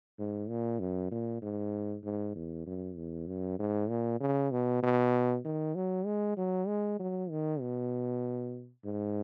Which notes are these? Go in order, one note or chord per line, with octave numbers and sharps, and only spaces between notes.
G#2
A#2
F#2
A#2
G#2
G#2
E2
F#2
E2
F#2
G#2
A#2
C#3
B2
B2
D#3
F#3
G#3
F#3
G#3
F#3
D#3
B2
G#2